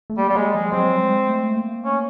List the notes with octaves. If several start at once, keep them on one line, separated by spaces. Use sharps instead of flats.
A3
G3 A#3
G3
G#3 A#3
F3 G#3
G3
F#3 C4
G3
G#3
A3
A#3
C#4